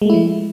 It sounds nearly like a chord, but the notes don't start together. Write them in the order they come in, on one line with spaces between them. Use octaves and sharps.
G#3 A3 E4 F3